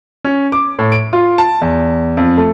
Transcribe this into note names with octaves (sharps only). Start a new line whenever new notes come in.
C#4
D6
A2
D7
F4
A5
E2
F2
A3